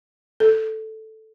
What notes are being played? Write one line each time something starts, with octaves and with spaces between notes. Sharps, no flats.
A4